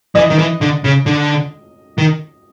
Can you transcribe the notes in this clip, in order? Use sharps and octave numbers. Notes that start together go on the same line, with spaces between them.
E3 D#5
D#3
E3
D3
C#3
D3
D#3